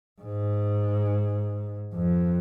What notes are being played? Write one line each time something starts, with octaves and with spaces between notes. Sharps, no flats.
G#2
F2